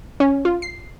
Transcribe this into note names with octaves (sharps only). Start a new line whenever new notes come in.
C#4
F4
C7